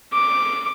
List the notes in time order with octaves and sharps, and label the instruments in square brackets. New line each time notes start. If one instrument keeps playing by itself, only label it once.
[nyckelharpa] D6